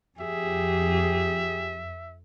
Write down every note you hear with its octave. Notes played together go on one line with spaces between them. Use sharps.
F2 G4 G#4 E5